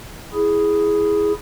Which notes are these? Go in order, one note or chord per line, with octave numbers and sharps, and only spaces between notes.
E4 G#4